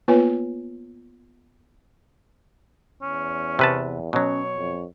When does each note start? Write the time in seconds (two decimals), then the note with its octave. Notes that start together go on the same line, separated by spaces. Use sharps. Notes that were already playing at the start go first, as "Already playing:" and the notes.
0.08 A#3 B3 F4 B4 C#5 G#5
3.02 E2 C#4
3.59 C3 B4 A5
4.13 B2 F#3 C#4 C#5
4.57 F2